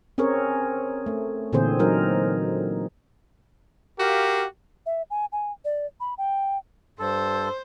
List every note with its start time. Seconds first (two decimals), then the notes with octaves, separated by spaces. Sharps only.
0.18 C4 C#4 G#4 A#4 C#5
1.06 A3
1.53 A#2 D3 E3 C4 G#4 C5
1.79 F#3 D#4 A#4
3.99 F#4 G4 A#4 F5
4.86 E5
5.10 G#5
5.32 G#5
5.65 D5
6.00 B5
6.18 G5
6.99 G2 A4 C5